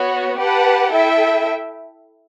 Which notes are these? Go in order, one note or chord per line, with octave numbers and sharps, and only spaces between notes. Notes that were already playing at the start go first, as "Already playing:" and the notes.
Already playing: B3 F#4 C#5
G4 B4 F#5 A5
E4 A4 E5 G5